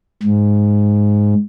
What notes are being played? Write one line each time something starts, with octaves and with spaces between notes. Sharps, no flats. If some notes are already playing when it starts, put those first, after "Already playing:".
G#2